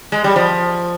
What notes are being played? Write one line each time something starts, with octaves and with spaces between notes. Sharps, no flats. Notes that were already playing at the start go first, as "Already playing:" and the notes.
G#3
G3
F3